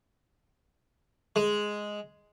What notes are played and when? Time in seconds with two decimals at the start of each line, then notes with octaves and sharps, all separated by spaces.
1.36 G#3